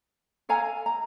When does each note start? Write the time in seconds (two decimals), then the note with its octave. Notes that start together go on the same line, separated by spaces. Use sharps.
0.49 A4 F5 G#5 A#5
0.86 A#5